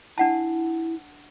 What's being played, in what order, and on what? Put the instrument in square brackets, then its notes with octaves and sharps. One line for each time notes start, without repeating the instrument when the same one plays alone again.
[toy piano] D4 F#5 A5 [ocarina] E4